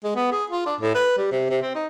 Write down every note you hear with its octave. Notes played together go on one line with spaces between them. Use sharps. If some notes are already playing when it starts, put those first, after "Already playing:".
G#3
B3
G#4
F4
D4
A2
B4
G3
C3
C3
C4
D#4